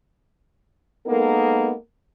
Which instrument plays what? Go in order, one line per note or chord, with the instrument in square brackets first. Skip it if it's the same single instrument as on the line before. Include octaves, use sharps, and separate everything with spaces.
[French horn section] G#3 A#3 B3 D#4 A4 A#4